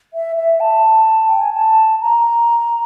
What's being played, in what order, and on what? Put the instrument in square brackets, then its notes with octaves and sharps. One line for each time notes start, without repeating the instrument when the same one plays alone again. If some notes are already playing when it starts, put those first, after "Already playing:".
[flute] E5
E5
A5
G5
G#5
A5
A#5